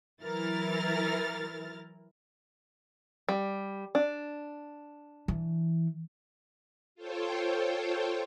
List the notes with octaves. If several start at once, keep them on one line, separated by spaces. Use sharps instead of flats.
E3 F#3 E4 A#4 F6 A6
G3
D4
E3
F4 A4 C5 C#5 G5